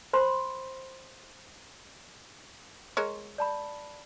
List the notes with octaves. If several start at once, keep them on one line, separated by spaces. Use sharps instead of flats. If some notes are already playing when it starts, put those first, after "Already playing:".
C5 B5 C6
G#3 A#4 C#5
D5 A5 B5